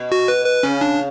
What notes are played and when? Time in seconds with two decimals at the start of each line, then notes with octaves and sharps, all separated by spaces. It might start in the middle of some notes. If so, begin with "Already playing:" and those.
Already playing: B2
0.12 F#4
0.28 B4
0.46 B4
0.63 C#3 C#4
0.81 D4